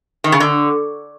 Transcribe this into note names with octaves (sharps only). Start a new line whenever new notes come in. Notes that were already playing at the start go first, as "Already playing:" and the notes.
D#3
C#3
D3